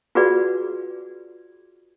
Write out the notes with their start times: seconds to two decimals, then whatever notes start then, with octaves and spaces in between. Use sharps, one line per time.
0.15 F4 F#4 G#4 B4 D5